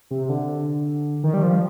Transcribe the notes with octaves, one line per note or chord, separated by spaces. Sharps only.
C3
D3
D#3
G3
F3